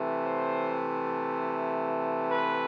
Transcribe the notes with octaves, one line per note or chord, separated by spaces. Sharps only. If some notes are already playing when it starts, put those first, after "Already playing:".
Already playing: C3 E3 A3
C5
B4